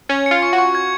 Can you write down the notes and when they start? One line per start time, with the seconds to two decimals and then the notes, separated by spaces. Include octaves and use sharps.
0.09 C#4 G#6
0.26 F4 C#7
0.43 C#6
0.53 F#4
0.58 C#6
0.75 G#6